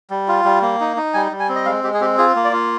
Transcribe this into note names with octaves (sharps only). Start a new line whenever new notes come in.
G3
F4
G3
A#3
D#4
D#4
G3 G#5
G3
G#5
C4
D#5
G#3 F5
G#3 G4
G#4
C4 G4
F4 G#4
A#3
D5
F4